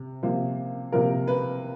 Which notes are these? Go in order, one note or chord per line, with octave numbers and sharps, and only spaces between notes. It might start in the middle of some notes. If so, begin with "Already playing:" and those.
Already playing: C3
C3 F3 A#3
C3 F3 A#3 A#4
B4